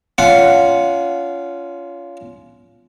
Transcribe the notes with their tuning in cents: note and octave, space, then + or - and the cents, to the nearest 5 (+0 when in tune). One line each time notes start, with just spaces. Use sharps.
C#4 +30 F4 -10 F#5 +0